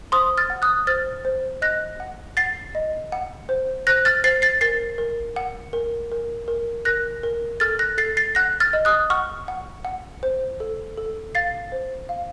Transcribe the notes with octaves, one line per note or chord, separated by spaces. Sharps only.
C5 C6 D#6
F6 A6
F#5
D#6 F#6
C5 F6 A6
C5
D#5 F#6 A#6
F#5
F#5 A6 C7
D#5
F#5
C5
C5 F#6 A#6
F6 A6
C5 A6 C7
A6 C7
A#4 A6 C7
A#4
F#5
A#4
A#4
A#4
A#4 F#6 A#6
A#4
A4 F6 A6
F#6 A#6
A4 A6 C7
A6 C7
F#5 F#6 A#6
F6 A6
D#5
D#6 F#6
F#5 C#6 F6
F#5
F#5
C5
A4
A4
F5 A6 C7
C5
F5